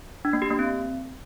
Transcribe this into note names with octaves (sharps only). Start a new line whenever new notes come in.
D4
A#3
G4
A#3
C4